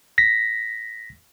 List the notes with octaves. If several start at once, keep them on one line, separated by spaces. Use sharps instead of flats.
A#6 B6